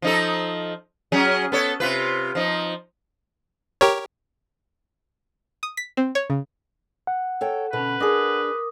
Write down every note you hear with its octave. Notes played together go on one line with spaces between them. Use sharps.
F3 D#4 A4
F#3 C#4 G#4
B3 A4 C#5
C3 F4 B4
F3 D#4
G4 A#4 C#5
D#6
B6
C4
C#5
C#3
F#5
A4 C#5 G5
B2 D3 C#4 B4 B5
D4 G#4 A#4 D6 D#6